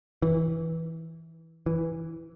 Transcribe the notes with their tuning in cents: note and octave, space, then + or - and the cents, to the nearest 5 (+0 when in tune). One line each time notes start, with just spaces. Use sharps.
E3 -15
E3 +0